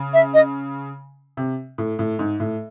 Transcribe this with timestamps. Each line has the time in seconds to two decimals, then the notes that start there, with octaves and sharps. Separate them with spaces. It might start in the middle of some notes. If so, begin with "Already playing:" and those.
Already playing: C#3
0.14 E5
0.34 D#5
1.37 C3
1.78 A2
1.99 A2
2.19 G#2
2.40 A2